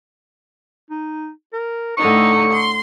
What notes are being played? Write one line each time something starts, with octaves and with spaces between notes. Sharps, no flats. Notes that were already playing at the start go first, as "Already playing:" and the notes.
D#4
A#4
A2 D3 D#4 C#6
C6